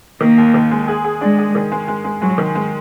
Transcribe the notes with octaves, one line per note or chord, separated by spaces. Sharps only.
D#3 A#3
D#2
D#3
G#3
G#4
G#4
G#3 D4
G#4
D#3
G#3
G#3
G#3
F#3 G#3
D#3
G#3